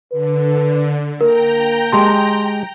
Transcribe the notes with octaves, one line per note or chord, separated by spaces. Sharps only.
D3 B4
A#3 A#4 G5 A#5
G#3 G4 A5 C6